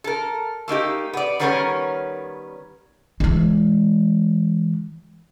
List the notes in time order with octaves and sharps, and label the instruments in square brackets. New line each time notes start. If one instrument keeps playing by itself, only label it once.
[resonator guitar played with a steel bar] A4 A#4
A3 A#3 D#4 G4
B3 D5
D#3 G3 B3 C#4 A#4 C#5
[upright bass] E3 G#3